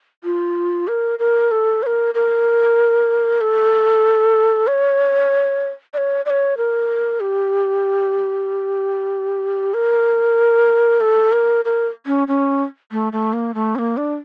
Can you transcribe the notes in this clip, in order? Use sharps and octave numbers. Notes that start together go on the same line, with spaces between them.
F4
A#4
A#4
A4
C#5
A#4
A#4
A4
C#5
D5
C#5
D5
C#5
A#4
G4
A#4
A4
A#4
A#4
C#4
C#4
A3
A3
A#3
A3
C#4
A#3
D4